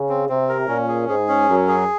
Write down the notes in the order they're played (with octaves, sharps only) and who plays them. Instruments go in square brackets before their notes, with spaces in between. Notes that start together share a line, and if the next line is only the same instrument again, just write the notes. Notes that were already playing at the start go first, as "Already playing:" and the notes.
Already playing: [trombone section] C#3
[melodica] C4
[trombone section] C3 [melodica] C4
[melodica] A#4
[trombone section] A#2 [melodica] C#4
[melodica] G#4
[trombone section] G#2 [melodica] G#4
[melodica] C#4
[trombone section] F#2 [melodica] F#3
[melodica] G#4